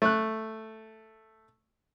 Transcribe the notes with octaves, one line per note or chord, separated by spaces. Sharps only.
A3 F#6